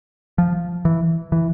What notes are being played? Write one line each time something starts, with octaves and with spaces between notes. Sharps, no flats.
F3
E3
E3